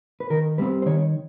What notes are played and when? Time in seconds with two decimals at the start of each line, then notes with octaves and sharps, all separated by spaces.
0.20 B4
0.30 D#3 A#4
0.58 G3 C4 B4
0.82 C5
0.86 D#3 C#5